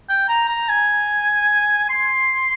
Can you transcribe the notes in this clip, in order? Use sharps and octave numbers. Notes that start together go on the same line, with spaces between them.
G5
A#5
A#5
G#5
C6